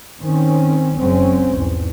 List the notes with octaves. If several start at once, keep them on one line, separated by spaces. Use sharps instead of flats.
D#3 C4 C#4
F#1 F#3 G#3 C4 C#4
B1 E2 G#2